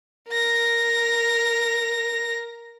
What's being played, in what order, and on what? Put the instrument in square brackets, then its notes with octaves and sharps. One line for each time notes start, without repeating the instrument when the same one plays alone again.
[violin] A#4 A#6